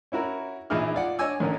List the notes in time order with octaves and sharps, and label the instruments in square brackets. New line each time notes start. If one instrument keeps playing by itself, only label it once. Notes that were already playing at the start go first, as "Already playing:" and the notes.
[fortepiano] C#4 E4 F#4 A#4
A#1 E3 D#4 E4 G#4 F6
F4 D5 F#5
D4 C#5 D#5 G#5 E6
A1 D#3 C#4 A#4